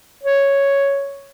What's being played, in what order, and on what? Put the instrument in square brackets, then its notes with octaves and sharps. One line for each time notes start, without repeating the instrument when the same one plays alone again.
[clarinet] C#5